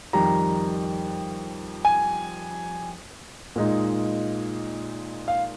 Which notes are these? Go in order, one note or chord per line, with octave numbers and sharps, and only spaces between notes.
F2 D#3 G3 A#5
G#5
A#2 G#3 D#4
F5